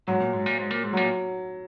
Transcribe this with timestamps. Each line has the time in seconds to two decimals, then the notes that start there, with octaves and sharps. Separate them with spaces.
0.07 G#2 F#3
0.20 A#2
0.33 G#2
0.46 A#2
0.58 G#2
0.71 A#2
0.84 G#2
0.93 F#3
0.97 A#2